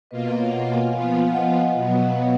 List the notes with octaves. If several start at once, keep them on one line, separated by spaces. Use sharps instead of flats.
B2 A#3 F4 B4 D#5
B4 D#5
C#5 F5
D#5 F#5
F5 G#5
F3 B3 F4 F5 G#5
D#5 F#5
F5 G#5
D#5 F#5
B2 F#3 B3 D#5 F#5
F#5
F5
B4 D#5